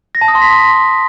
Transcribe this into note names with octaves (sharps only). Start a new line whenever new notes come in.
A#6
A5
D#6
C6
B6